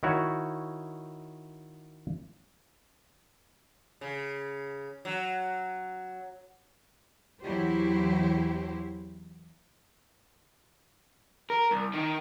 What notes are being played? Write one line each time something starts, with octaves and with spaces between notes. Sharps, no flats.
D#3 E4 F#4 C#5
C#3
F#3
E2 F#3 E4 G4 C5
A#4
C2
D#3 D#4